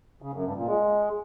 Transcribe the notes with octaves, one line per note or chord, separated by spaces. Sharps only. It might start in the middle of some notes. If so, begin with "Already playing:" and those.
C#3
F#2
G2
A#2
G#3